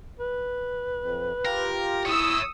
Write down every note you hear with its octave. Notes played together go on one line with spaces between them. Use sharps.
B4
F2
F4 G4 A#4
E4 C#5 E5 D#6 E6